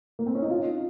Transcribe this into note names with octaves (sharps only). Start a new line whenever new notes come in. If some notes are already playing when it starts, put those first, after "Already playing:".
A#3
C4
C#4
D#4
F4